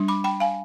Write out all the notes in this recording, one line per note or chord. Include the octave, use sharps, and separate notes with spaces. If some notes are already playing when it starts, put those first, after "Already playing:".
Already playing: G3 D4
B5 D6
G5 B5
F5 G#5